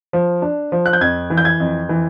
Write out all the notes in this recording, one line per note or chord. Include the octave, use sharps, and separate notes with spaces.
F3
D4
F3
F#6
G6
F2 G#6
E3
G6
G#6
F2
E3